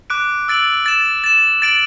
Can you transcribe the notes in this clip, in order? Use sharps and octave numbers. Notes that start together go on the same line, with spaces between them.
D6 F#6 D7
E6 A6 D7 F#7
A6 E7
A6 E7
A6 D7 F#7